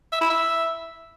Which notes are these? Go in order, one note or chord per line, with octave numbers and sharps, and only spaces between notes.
E5
E4
E5